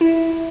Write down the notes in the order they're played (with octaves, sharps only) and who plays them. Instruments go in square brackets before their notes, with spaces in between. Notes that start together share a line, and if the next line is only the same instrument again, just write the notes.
[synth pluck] E4